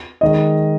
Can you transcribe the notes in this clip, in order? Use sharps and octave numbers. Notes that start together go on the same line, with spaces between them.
D#3 G#3 D#5